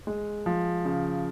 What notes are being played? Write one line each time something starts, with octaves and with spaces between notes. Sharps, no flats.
G#3
F3
C#3